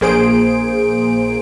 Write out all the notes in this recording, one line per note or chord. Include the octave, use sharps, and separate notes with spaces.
A#1 A#3 G#4 C5 D7